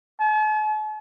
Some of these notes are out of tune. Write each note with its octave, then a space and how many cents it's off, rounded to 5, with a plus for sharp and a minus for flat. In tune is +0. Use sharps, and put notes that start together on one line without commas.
A5 -45